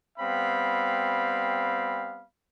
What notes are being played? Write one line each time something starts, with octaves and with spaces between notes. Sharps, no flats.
G3 B3 C4 F5 B5